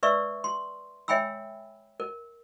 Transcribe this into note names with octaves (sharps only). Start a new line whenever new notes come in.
B4 D5 E5 C#6 E6
C6
C#5 E5 G5 G#5 B5 E6
A#4